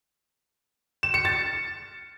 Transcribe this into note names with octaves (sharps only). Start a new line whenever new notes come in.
E7
C#7
A6